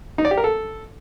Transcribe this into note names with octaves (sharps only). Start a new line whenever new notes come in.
D#4
D5
G4
A#4
A4